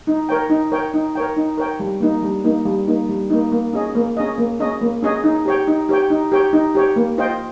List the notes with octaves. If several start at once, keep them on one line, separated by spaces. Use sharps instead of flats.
D#4
A#4 C#5 G5
D#4
A#4 C#5 G5
D#4
A#4 C#5 G5
D#4
A#4 C#5 G5
G3
A#3 D#4
G3
A#3 D#4
G3
A#3 D#4
G3
A#3 D#4
A#3
C#4 G#4 D#5
A#3
C#4 G#4 D#5
A#3
C#4 G#4 D#5
A#3
C#4 G#4 D#5
D#4
G4 C#5 G5
D#4
G4 C#5 G5
D#4
G4 C#5 G5
D#4
G4 C#5 G5
A#3
F4 C5 D#5 G5